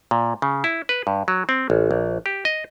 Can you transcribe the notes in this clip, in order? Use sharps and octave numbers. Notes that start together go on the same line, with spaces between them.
A#2
C#3
E4
B4
G2
F#3
C4
A1
A#1
G4
D#5